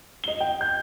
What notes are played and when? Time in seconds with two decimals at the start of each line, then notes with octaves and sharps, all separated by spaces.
0.24 D#5 G7
0.40 G5
0.61 G6